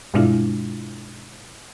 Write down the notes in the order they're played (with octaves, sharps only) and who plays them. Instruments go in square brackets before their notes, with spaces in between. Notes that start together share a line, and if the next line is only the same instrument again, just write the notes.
[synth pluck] G2 B2 G#3 D4 E4 F4